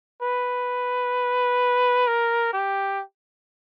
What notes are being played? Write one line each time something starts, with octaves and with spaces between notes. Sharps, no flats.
B4
A#4
G4